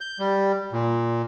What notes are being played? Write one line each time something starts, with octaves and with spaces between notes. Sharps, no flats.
G6
G3
A#2